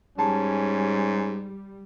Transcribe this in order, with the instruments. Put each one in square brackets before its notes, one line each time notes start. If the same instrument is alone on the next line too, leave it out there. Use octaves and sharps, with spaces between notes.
[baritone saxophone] G#2 [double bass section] G3 [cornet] C#4 [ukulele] A5